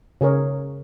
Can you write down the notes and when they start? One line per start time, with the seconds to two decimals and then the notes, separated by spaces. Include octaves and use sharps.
0.21 C#3 G#4 A#4 C#5